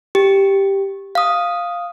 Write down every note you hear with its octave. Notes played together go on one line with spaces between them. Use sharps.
G4
F5 D#6